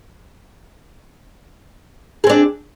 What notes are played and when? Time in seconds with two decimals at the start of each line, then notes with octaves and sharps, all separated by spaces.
2.24 G#4
2.27 C4
2.30 D4